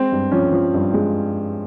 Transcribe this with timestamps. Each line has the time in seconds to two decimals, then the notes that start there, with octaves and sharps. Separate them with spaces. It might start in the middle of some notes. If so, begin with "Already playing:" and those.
Already playing: G#3 C4
0.12 G2
0.31 F3 C#4
0.52 F3
0.74 G2
0.94 G#3